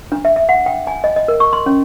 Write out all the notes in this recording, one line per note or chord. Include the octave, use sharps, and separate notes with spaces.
D4
E5
E5
F#5
G5
G#5
D#5
D#5
A#4
C#6
C6
C#4